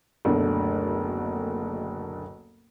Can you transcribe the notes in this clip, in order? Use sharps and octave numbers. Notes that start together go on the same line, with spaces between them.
F#1 D2 B2 D3 A3